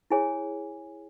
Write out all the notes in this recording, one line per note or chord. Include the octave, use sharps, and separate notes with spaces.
E4 G#4 C#5 G#5